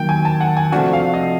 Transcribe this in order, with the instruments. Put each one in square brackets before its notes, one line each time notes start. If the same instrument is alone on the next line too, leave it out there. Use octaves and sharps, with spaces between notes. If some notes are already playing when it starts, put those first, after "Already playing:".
Already playing: [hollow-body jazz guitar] D#2 D#3 F#3 A#3 [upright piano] G5
[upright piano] G#5
A5
F#5
G#5
[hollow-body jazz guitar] C3 F3 A3 D4 F#4
[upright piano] F5
D#5